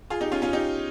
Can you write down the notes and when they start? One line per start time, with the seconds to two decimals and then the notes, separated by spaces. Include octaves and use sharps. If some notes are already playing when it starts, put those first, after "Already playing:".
0.10 F4 G#4
0.21 D#4 G4
0.32 C#4 F4
0.42 C#4 F4
0.53 D#4 G4